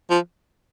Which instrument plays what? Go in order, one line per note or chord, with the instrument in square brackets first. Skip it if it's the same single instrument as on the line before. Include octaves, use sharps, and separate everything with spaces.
[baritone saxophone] F3